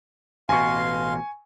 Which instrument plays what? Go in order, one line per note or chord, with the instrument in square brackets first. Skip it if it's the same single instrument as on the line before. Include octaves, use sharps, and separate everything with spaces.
[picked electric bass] A1 B2 [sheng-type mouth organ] F5 C6 [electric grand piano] G#5 C#6